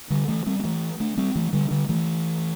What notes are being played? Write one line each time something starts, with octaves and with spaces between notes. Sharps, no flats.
D3 G3
E3 A3
G3 C4
C4
E3 A3
A3 D4
G3 C4
E3 A3
D3 G3
D3 G3
E3 A3